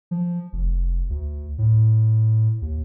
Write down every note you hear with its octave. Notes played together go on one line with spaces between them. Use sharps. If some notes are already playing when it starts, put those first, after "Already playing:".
F3
F1
D2
A2
D#2